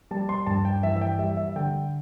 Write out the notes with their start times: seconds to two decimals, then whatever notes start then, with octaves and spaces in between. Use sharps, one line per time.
0.11 G3 A5
0.29 C6
0.46 G2 A5
0.65 G5
0.83 E3 E5
0.96 E5
1.01 G5
1.19 G3 E5
1.37 E5
1.56 D3 G5